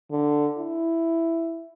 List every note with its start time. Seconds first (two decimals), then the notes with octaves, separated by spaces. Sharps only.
0.11 D3
0.58 E4